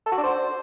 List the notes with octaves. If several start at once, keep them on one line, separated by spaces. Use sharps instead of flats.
A4
F#4
D4
C5